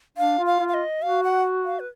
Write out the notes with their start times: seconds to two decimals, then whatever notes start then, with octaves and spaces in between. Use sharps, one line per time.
0.18 D4 F5
0.39 F4
0.46 F5
0.60 F4
0.68 F5
0.74 D#5
1.02 F#4 F5
1.23 F#5
1.65 F5
1.80 B4